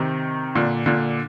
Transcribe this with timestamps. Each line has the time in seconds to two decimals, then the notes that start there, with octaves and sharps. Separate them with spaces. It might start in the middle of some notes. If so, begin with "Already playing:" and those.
Already playing: C3 D#3
0.55 A#2 D3
0.86 A#2 D3